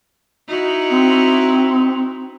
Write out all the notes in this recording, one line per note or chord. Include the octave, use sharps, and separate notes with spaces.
D#4 E4 F#4
C4